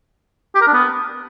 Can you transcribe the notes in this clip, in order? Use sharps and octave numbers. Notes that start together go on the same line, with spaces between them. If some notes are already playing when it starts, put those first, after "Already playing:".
G4
A#4
D4
B3